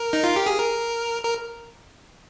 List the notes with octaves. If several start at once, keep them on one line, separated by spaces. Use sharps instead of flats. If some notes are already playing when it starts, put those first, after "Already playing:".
Already playing: A#4
D#4
F4
G4
G#4
A#4
A#4